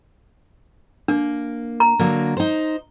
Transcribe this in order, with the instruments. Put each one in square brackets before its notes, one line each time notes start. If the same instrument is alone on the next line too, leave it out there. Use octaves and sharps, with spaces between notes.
[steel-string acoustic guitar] A#3 [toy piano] D4
[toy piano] A#5
[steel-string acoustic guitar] D3 F#3 A#3
D#4 C5